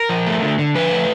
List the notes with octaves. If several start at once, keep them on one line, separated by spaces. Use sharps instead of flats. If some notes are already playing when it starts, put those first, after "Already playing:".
Already playing: A#4
F3
A3
D3
D3
F3 B4
A3